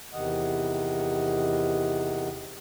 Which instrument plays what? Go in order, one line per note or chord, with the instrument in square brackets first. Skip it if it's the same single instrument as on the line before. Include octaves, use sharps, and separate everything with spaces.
[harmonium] E2 C3 D#3 D#5 F#5